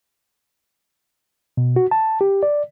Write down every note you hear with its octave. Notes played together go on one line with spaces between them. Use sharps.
B2
F#4
A5
G4
D5